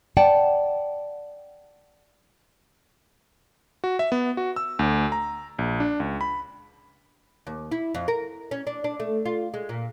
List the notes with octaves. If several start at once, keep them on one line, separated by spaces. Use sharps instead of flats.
D5 F#5 G5 A5
F#4
E5
B3
F#4
E6
D2
A#5
A#1
D4
C#2
B5
D#2
E4
F2
A#4
C#4
D4
D4
A3
F4
G#3
A#2